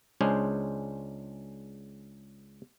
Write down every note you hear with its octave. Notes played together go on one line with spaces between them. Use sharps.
C#2 G#3 C#4 D4 G#4 C5